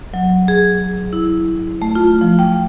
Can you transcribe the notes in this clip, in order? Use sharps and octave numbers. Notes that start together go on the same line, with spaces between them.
F#3
G#4
E4
A3
F4
F3
G5